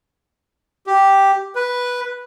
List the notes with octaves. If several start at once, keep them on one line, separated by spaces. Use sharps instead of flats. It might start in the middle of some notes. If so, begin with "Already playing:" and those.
G4
B4